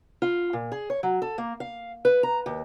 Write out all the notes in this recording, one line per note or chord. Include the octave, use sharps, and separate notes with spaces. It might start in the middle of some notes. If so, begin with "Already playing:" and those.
F4
A#2
G#4
C#5
F#3
A4
A#3
F5
B4
A#5
D#2